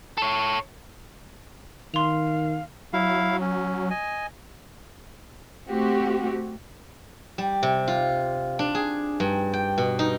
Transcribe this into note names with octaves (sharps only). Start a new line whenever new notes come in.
A4 C#5
D#3 F5 C6 F7
F#3 E4 F5
C#4
D#5 G#5
A3 C4 F#4 G4
G3
C3
F4
D4
G#4
G2
G5
B2
D#4